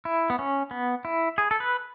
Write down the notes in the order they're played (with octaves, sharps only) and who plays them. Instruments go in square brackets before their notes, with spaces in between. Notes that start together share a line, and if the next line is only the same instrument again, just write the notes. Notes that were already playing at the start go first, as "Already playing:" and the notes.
[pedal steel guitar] E4
B3
C#4
B3
E4
G#4
A4
B4